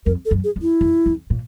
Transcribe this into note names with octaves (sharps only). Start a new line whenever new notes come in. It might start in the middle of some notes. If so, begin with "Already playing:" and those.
F2 A#4
A4
F#2
G#4
F2
E4
F2
F2
A#2